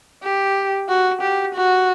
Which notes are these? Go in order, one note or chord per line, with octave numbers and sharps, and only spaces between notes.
G4
F#4
G4
F#4